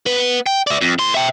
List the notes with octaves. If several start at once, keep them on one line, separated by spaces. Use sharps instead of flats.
B3 B4
G5
D5 E5
F2
A2 C6
E5 G5